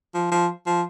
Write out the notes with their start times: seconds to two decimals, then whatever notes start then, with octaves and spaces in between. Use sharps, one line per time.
0.14 F3
0.32 F3
0.66 F3